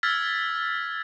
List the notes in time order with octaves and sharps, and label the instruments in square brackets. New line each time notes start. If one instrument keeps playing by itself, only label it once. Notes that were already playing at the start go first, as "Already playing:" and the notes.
[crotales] E6 F6 G#6 A6 B6